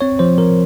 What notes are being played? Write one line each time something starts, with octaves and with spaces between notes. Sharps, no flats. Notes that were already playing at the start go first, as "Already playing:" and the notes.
C4 C#5
F3 C5
F3 A#4